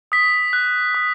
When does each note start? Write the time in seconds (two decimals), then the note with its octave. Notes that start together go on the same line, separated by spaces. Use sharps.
0.12 D#6 B6
0.53 F#6
0.94 D#6